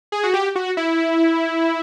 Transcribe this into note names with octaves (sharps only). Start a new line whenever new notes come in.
G#4
F#4
G4
F#4
E4